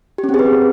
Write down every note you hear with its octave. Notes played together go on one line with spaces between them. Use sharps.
G4
C#4
C4
G#4
B4